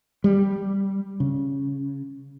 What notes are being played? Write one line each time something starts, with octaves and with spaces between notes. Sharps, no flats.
G3
C#3